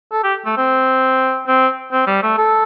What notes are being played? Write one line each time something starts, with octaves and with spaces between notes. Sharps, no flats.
A4
G4
A3
C4
C4
C4
G3
A3
A4